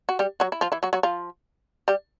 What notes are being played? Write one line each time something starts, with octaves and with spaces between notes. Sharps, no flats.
F#4
G3 G4
F#3 F#4
E4
F3 F4
E3 E4
F#3 F#4
F#3 F#4
F3 F4
G3 G4